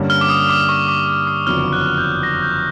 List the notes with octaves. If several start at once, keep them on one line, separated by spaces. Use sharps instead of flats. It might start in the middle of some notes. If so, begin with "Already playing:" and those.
Already playing: G2 D3 G3 A#3 C#4
F6
D6
D#6
D6
C#6
D6
D6
D#6
F#1 F2 D3 F#3 B3 F6
F#6
G6
A#6
G6